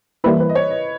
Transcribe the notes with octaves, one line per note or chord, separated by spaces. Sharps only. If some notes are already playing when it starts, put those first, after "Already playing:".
E3 G3 A#3 E4 B4
B4
D#5
C#5
D#5